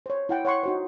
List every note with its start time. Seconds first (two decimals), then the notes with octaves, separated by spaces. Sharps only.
0.06 C5 C#5
0.29 E4 F#5 G5
0.45 C#5 F#5 C6 C#6
0.63 D#4 F#4 C5